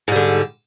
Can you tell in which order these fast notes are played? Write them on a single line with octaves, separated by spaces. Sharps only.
G#2 G3 D3